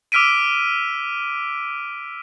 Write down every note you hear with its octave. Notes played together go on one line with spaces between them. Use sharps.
D6 E6 F6 B6 D7 D#7